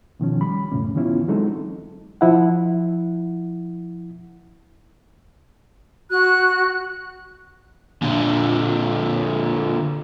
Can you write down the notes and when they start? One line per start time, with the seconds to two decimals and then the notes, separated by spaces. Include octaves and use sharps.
0.20 B2 D#3 F3 C#4
0.41 G3 B5
0.72 F2 A2 C#3 A3 C#4
0.95 D3 E3 B3 C#4 E4 F4
1.28 F#3 G#3 C4 D#4 A4
2.21 F3 E4 F#5
6.10 F#4 F#6
8.02 A#2 D3